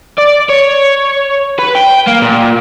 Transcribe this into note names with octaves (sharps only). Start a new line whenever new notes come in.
D5
C#5
B4
G5
A#3
A#2